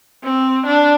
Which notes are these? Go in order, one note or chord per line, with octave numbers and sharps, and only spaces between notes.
C4
D4